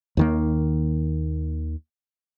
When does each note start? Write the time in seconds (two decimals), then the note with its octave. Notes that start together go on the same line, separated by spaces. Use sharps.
0.17 D#2 D#3 A#3